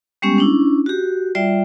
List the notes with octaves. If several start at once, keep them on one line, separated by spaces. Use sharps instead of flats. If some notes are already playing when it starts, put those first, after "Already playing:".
G3 G#3 B3 C#4 G4 C#6
C#4 D4 E4
F#4 G4
G3 F4 D5 E5 G5